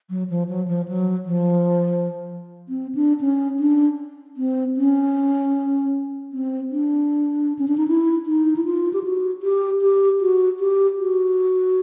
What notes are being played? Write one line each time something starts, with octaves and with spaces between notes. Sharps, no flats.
F#3
F3
F#3
F3
F#3
F3
C4
D4
C#4
D4
C4
C#4
C4
D4
C#4
D4
D#4
E4
D#4
E4
F4
G4
F#4
G4
G4
F#4
G4
F#4